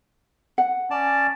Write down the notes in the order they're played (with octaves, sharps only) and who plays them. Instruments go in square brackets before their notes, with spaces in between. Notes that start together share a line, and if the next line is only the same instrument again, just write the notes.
[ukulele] F#5
[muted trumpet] C#4 [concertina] D5 A5